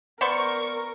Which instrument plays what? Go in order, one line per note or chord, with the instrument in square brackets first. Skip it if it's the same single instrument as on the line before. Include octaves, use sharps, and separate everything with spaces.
[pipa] B3 C5 D5 [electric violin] A#4 [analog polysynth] C#6